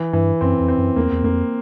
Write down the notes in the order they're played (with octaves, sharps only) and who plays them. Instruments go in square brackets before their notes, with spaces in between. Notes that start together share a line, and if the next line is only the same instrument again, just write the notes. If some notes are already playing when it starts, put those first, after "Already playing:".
Already playing: [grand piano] E3
[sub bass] G2 [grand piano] E3
[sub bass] F#2 [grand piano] C4
[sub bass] F2
[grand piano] C4
[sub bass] F#2
[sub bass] E2 [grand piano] A#3
[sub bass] E2
[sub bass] F2 [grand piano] A#3